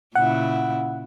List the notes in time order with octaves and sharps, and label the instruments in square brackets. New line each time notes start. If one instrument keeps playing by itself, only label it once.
[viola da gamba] A#2 C#3 E4 [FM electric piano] F#5